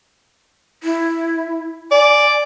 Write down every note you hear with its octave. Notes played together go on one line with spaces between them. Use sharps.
E4
D5 G#5